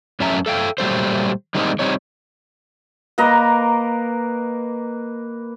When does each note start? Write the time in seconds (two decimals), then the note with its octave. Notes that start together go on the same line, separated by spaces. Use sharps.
0.20 F#2 F#3 A3 C#4 E5 A#5
0.46 A4 E5 F5 G5
0.78 A#2 F#3 G3 A3 C5
1.55 D#3 G3 G#3 A#3 C4 D#4
1.79 G3 C4 D#4 C#5
3.18 A#3 B4 D#5 A#5